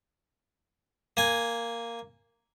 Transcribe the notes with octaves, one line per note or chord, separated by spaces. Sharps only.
A#3 G#5